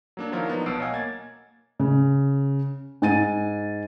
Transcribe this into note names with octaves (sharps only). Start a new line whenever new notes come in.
F#3 A#3 D4
D#3 F3 F#3 E4 F4 A#4
F3 B3 D4 D#4
B1 B2 A5 E6 C7 D7
C#5 D#5 F5 F#5 G#5
A#3 G#6 A6
C#3
G#2 G#5 A6 D#7